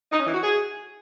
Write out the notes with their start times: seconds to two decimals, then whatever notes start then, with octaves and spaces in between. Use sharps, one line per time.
0.11 D#4
0.19 C#4
0.27 E3
0.34 F#4
0.42 G#4